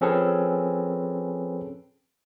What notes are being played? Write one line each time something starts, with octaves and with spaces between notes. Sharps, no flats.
F3 C4 C#4 G#4 A4 B4